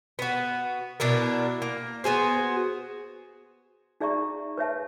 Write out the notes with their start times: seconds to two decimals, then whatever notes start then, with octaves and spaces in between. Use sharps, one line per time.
0.19 B3 F#4
1.00 B2 D4 E4 A#4
1.62 A#3
2.04 B3 F#4 G#4 C5
4.00 D#4 G#4 D5 E5 A#5 C#6
4.57 B4 C#5 E5 A5